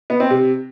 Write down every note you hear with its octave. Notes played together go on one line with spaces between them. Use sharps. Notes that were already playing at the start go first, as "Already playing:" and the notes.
B3
C4
C3